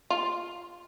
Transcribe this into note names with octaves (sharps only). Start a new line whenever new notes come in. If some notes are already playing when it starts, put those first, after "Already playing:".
F4